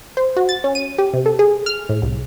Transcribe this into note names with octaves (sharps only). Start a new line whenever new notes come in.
C5
F#4
A6
C#4
D#7
G4
C3
A4
G#4
F6
A2
C2